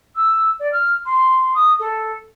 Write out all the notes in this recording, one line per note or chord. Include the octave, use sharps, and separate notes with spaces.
E6
D5
F6
C6
D#6
A4